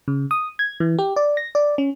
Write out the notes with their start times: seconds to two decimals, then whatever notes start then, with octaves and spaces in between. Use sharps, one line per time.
0.08 C#3
0.31 D#6
0.59 G#6
0.80 E3
0.99 G4
1.16 D5
1.37 A#6
1.55 D5
1.78 C#4